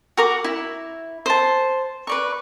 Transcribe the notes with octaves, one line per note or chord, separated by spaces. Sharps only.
F#4 A#4 D6
E4
C5 A5
B4 D5 C#6